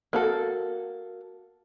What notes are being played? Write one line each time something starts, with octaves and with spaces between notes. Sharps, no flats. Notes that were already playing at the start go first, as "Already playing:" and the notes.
A#3 F#4 A4